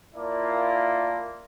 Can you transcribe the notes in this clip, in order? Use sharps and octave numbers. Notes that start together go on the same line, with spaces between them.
A#3 E4 F4 D5 A5